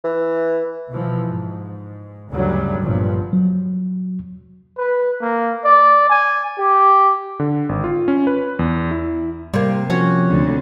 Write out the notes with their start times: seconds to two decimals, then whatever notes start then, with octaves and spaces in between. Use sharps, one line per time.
0.04 E3
0.91 B2 E3 F3
1.24 G#2
2.30 D2 G2 C#3 F#3 G3
2.82 G1 G2 A#2 F3 B3
3.33 F#3
4.78 B4
5.22 A#3
5.65 D5
6.09 G#5
6.59 G4
7.40 D3
7.69 G#1
7.84 F4
8.08 C#4
8.27 B4
8.59 E2
8.91 E4
9.54 C3 G3 A#3
9.90 F3 C#4 F#4 C#5
10.29 D2 D3